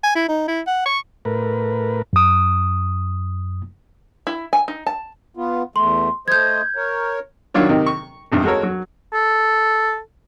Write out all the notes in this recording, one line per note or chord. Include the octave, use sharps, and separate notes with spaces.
G#5
E4
D#4
E4
F#5
C#6
A2 A#4 B4
F#2 D#6
E4
G#5
D#4
A5
B3 F4
E2 A3 C6
A3 C5 D#5 G6 G#6
A#4 C#5
D#3 F#3 D4 F4 C#5
C3 D#3 D#4
C#6
G#1 E2 G2
G#3 F#4 A4 A#4 C#5
F#3
A4